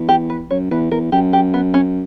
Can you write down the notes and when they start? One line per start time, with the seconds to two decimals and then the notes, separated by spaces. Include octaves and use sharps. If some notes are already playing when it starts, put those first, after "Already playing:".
Already playing: E2
0.09 G4
0.30 B4
0.50 F#2 C#5
0.71 E2 B4
0.91 E2 A#4
1.12 F#2 G4
1.33 G4
1.54 B3
1.74 C#4